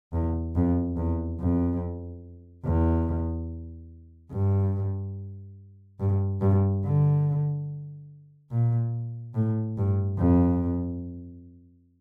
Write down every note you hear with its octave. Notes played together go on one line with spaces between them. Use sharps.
E2
F2
E2
F2
E2
G2
G2
G2
D3
A#2
A2
G2
F2